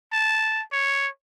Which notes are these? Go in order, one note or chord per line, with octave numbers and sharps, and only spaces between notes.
A5
C#5